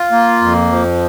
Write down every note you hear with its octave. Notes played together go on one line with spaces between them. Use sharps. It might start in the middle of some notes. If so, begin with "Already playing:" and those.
Already playing: F4
A#3
F2
F3